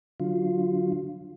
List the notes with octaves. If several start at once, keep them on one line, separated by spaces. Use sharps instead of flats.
D3 F#3 F4